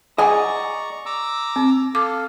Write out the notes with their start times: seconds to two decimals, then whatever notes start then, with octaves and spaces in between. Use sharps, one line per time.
0.18 G#4 D5 D#5 F#5 G#5 A#5 C#6
1.06 A#5 D6 E6
1.56 C4
1.95 A4 F5 D6